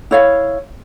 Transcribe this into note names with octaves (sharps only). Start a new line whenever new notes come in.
E4 C#5 F5